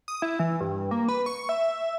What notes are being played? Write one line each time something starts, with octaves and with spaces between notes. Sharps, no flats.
D#6
E4
E3
G2
A#3
B4
C#6
E5